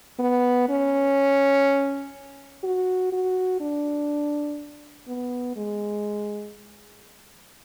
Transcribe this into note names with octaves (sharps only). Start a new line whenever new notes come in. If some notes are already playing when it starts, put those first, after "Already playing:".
B3
C#4
F#4
F#4
D4
B3
G#3